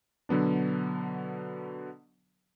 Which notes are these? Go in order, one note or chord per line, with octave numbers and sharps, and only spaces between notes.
B2 D3 F#3 B3 D4